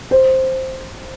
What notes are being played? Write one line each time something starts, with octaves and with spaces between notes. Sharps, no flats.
C5